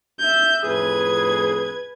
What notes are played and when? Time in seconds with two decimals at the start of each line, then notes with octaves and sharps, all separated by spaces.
0.20 E5 G6
0.63 F2 A2 G#4 B4 G#6